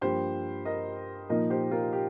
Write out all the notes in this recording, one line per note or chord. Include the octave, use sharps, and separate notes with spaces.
G2 F3 A#3 G4 C5
A#4 D#5
A#2 F3 A#3 D#4 A#4 D#5
G4 C5
F4 A#4
G4